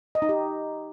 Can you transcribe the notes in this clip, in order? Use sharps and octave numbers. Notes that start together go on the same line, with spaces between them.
D#5
D#4
G4